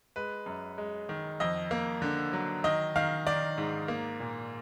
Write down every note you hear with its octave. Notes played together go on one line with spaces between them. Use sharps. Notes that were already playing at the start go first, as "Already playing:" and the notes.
G#3 B4
F#2
G#3
D#3
F2 D#5
A#3
D3
F#3
D#3 D#5
D#3 F5
D#3 D5
G#2
A#3
A#2